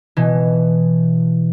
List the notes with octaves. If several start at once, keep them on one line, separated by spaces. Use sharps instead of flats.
B2 E3